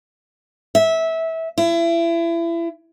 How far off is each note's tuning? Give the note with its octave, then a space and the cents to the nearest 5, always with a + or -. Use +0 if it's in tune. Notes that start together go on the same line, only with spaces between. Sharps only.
E5 -20
E4 +30